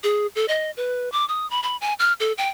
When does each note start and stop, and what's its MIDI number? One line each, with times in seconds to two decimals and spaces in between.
0.04 0.27 68
0.36 0.48 69
0.48 0.71 75
0.77 1.11 71
1.12 1.27 86
1.28 1.49 87
1.50 1.60 83
1.63 1.77 83
1.81 1.94 80
1.99 2.13 89
2.20 2.32 69
2.38 2.49 79